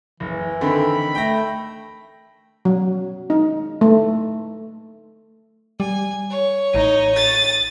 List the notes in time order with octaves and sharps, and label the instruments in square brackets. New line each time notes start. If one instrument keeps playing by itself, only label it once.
[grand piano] F#1 [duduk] E3
[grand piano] D3 D#3 C4 [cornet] B5
[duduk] A3 [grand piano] G5 A#6
[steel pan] F#3
D#4
A3
[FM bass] G3 [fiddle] G#5
[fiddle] C#5
[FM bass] A1 [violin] D#4
[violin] D#6 A6